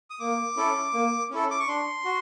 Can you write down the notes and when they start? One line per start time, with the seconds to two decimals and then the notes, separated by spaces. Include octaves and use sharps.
0.10 D#6
0.19 A#3 D6
0.56 C#4 E4 A4
0.94 A#3
1.30 C#4 E4 A4
1.51 D6
1.60 C#6
1.67 D4 C6
2.05 F#4